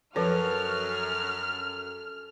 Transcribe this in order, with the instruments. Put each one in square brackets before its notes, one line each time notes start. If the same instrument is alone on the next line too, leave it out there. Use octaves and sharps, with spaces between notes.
[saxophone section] F#2 [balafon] F3 B4 C#5 [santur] A4 [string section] F6